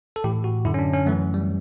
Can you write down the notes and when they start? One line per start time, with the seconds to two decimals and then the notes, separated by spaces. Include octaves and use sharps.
0.16 A4
0.24 A2 E3 G4
0.44 F#4
0.65 F#2 D3 E4
0.74 C#4
0.79 D4
0.93 C#4
1.06 F#2 E3 A3
1.34 G3